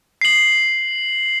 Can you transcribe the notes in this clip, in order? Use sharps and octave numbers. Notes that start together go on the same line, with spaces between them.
C7 F#7